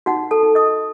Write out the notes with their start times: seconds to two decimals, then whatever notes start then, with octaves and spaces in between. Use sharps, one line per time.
0.06 D#4 F#4 F#5
0.31 A4 A5
0.43 D#4
0.55 D#5 D#6